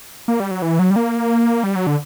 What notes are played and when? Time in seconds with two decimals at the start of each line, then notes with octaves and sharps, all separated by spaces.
0.28 A#3
0.40 G3
0.51 F#3
0.62 E3
0.79 F#3
0.90 G3
0.96 A#3
1.64 G3
1.76 F#3
1.87 D3